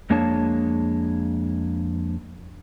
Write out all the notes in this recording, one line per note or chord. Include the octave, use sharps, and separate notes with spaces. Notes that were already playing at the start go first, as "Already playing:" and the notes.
F2 G#3 A#3 D4 C#5 A5